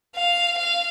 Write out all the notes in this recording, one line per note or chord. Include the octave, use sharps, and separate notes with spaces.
F5
F5